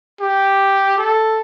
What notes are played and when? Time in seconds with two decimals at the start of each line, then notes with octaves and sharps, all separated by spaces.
0.21 G4
0.98 A4